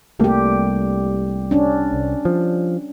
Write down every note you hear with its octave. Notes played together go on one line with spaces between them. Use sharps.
C2 G3 A3 A#3 G4
C#4 D4
C2
F3